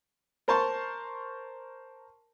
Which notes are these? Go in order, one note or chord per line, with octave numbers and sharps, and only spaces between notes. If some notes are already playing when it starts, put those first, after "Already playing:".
A#4 C5 A5 C6 C#6